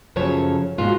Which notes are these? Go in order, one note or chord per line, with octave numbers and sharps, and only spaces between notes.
F#2 C#3 F3 A4 C#5
G#2 B2 F4 F#4